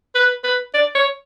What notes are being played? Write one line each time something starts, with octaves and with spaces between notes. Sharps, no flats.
B4
B4
D5
C#5